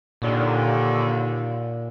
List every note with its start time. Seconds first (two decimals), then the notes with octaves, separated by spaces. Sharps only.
0.22 D#2 A#2 D3